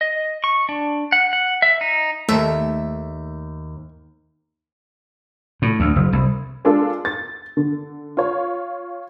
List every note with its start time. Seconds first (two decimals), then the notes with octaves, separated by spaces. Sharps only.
0.01 D#5
0.44 C#6
0.69 D4
1.12 F#5
1.33 F#5
1.62 E5
1.81 D#4
2.29 D#2 D#3 A3 E5
5.62 A2
5.80 D2
5.96 F#1
6.13 C2
6.65 G#3 D4 F4 A4
7.05 A6
7.57 D3
8.17 F4 C#5